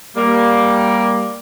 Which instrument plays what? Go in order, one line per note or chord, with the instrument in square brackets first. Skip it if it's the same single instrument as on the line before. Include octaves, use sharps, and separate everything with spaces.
[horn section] G3 A#3